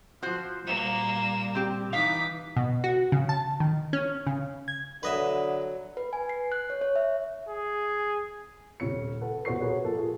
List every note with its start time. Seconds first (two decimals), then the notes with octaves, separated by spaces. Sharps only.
0.23 F3 F#4 C5
0.66 A#2 G3 A#3 E7
1.55 C4 G4
1.93 E3 D#4 F5 D6 B6
2.57 B2
2.84 F#4
3.12 C#3
3.29 A5
3.60 D#3
3.93 C#4
4.27 C#3
4.68 G#6
5.03 D3 F#3 B4 D#5 E5
5.97 B4
6.13 G#5
6.29 C7
6.52 F#6
6.70 C#5
6.81 C#5
6.96 E5
7.49 G#4
8.80 D#1 C#3 C#4 C#7
9.21 A4 B4 F#5
9.45 D#1 B2 C5 F#5 C#6 C7
9.60 F#4 G#4 A#4 B4 C#5
9.84 A#2 F3 A#3 F4 A4
9.97 F4 G#4